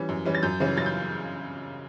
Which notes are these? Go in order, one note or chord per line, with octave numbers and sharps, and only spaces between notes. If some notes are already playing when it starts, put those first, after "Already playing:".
Already playing: E3 G3 C#4
F#2
E3 G3 C#4
A6
F#2 G6
C#3 E3 G3 C#4
F#2 A6
G6